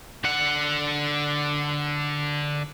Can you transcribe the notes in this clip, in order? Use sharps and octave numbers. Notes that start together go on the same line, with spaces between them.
D3 F#5